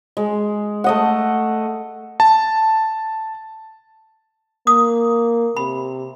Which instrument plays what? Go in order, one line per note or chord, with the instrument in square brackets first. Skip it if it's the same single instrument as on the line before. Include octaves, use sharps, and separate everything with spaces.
[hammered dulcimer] G#3
A3 D#5 F#5
[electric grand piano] A5
[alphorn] A#3 [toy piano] D#6
[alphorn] C3 [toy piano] B5